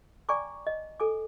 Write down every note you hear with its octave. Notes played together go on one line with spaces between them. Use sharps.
D5 G5 G#5 A#5 C#6 D6
D#5
A4 G#5 D6